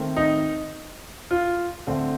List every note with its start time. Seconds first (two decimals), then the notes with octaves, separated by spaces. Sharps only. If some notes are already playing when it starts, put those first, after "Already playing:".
Already playing: D#3 A3 C4
0.16 D#4
1.31 F4
1.87 D3 A3 C4